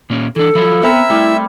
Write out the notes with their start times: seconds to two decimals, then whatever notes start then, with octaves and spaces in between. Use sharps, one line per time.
0.10 A#2 A#3 C#4
0.36 E3 D4 A4
0.55 F3 F#3 E4 F4
0.83 B3 C4 E4 A#4 E5
1.10 G3 A3 E4